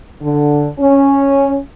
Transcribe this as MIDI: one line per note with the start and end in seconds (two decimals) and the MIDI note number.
0.21 0.66 50
0.78 1.56 61